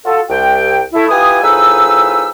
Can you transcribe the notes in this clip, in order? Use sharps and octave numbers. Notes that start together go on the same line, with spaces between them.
F4 F#4 A4
C2 G5
A3 E4
E4 F4 G4 B4 G#5 D#6
A2 F3 D#4 G#4 B4 E6